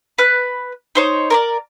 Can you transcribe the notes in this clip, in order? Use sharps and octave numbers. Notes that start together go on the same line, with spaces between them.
B4 F#6
D#4 C5 C#5
A#4 C#5 D5